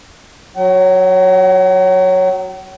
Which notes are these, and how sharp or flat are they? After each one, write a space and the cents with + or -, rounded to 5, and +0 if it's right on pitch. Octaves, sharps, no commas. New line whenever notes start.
F#3 +0 F#5 +45